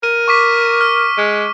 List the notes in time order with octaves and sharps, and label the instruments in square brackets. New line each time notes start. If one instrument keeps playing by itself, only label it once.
[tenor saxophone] A#4 [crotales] D#7
[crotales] C#6 D6 B6
F6
[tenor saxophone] G#3